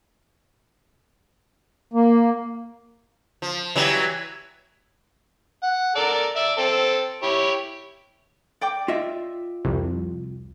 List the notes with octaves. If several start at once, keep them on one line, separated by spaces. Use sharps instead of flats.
A#3
F3
E3 F#3 G3
F#5
A4 A#4 D5
D5 E5
C4 A4
E4 G4 C#5
D5 G5 D6
F4 D#5 E5
C2 F2